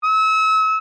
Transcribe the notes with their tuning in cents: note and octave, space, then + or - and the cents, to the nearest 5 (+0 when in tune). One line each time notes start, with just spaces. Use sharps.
E6 -35